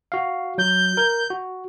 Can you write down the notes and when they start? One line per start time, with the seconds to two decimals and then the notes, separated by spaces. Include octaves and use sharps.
0.12 F#4 F5
0.58 F#3 G6
0.97 A#4
1.30 F#4